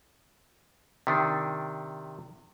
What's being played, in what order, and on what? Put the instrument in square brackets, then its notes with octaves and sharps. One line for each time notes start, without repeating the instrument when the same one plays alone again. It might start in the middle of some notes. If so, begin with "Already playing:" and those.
[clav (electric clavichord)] C3 D#3 D4